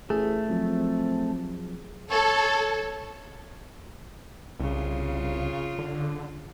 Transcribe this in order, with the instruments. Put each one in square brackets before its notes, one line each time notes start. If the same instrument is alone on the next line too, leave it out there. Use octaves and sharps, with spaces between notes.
[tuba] A1 [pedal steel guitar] A3 [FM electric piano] G#4
[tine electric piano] F3 F#3 [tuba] C4
[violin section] A4 [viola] C#5
[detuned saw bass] C2 [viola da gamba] C#3 F4
[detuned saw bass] D3